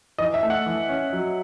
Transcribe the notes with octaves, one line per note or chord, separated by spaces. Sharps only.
E3 D#5
E5
A3
F#5
E3
C#4
F#3